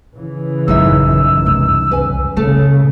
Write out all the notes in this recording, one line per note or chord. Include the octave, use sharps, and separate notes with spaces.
C#3 E3
A1 F#2 D#4 E5 E6
C2 F2
C#2 B4 G#5
C#3 A3 A#3 A4